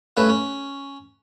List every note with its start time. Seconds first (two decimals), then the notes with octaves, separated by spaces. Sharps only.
0.17 G2 A3 C#4 B4 E5
0.29 C#4